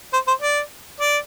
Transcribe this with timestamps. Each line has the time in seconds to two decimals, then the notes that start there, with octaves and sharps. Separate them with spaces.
0.13 C5
0.27 C5
0.42 D5
1.00 D5